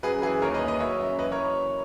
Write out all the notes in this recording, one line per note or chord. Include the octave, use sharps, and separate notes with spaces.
F#2 G#4 B4
E3 G#4 B4
D#2 A#4 C#5
B4 D#5
A#3
B4 D#5
F#3 C#5 E5
F#2
E3 B4 D#5
A#4 C#5